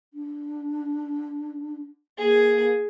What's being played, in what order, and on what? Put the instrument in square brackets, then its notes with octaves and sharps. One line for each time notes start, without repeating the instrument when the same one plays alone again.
[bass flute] D4
[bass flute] A#3 [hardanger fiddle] G#4